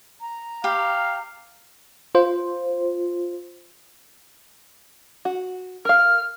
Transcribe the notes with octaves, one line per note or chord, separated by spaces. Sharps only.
A#5
G4 F5 B5
F4 C5
F#4
A#4 F5 F6